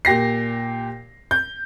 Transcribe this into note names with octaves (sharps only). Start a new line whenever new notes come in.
A#2 G4 A#6 C7
G6